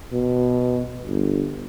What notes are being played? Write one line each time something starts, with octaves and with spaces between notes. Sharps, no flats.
B2
G1